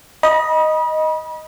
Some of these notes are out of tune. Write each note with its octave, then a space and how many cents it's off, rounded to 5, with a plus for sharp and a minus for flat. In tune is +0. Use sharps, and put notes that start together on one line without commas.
D#5 +0 B5 -40